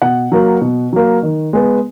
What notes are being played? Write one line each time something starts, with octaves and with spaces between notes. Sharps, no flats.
B2 F#5
F#3 A#3
B2
F#3 A#3
D#3
G#3 B3